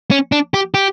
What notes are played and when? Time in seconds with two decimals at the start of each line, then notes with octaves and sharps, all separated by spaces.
0.11 C#4
0.32 D4
0.54 G4
0.74 G4